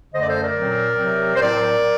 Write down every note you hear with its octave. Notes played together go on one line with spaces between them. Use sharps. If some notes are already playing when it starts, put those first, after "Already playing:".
F#2 D3 A3 C5 D#5
D5
A4 C5
A#4 D5
A#2 F#3 C4
C3 F#3 C4
C5
A2 F#3 C4 A#4 D5